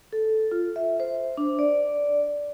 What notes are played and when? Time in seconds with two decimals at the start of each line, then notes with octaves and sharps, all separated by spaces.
0.13 A4
0.51 F4
0.76 E5
1.00 C5
1.37 D4
1.59 D5